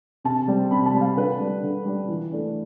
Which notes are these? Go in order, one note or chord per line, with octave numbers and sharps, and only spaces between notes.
C3 A5
G3 C4
C3 B5
A5
G3 C4
F5
D3 B4
G3 D4
D3
G3 D4
E3
A3 D4